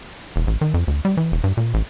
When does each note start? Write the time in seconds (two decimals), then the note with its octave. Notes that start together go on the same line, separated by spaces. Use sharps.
0.36 E1
0.47 A1
0.61 D#3
0.74 F2
0.88 D2
1.05 G3
1.17 E3
1.32 E1
1.44 G2
1.57 A#2
1.74 A1